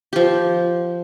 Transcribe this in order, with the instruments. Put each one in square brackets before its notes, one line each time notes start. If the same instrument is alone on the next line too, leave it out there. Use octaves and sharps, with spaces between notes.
[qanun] F3 G4